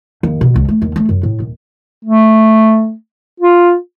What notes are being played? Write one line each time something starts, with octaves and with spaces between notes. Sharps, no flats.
D#2
B2
C#2
A3
D#2
A3
F#2
A2
D#1
A3
F4